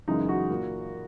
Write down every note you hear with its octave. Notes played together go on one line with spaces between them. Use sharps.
F#2 C#3 E3 G#3 D#4
F#4
A#2 A#3